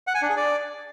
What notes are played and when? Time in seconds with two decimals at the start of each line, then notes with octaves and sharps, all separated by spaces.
0.07 F#5
0.15 G#5
0.22 D4
0.29 G#4
0.37 D5